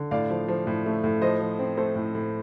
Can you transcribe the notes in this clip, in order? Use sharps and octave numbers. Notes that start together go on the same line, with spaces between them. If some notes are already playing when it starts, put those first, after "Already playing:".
Already playing: D3
A2 D5 F5
F3
F3
A2
A3
A2
F3 C5 D#5
F3
C4
A3 A4 C5
A2
A2